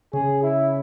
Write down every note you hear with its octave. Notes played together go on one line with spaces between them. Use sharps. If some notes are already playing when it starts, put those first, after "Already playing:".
C#3 G#4
E4